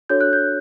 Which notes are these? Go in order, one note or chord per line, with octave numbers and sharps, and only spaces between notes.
D4 F#4 A4 C#5 G6
F#6
G6